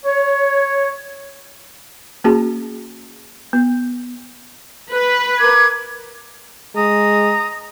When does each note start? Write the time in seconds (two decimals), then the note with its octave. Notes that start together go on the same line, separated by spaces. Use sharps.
0.05 C#5
2.24 A#3 C#4 F#4 G#4 A5
3.53 B3
4.92 B4
5.39 A#4 D6 G#6
6.76 G#3 A#5 D#6